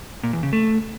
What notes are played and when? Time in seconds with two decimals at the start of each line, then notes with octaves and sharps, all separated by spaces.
0.23 A#2
0.33 E2
0.43 C#3
0.53 A3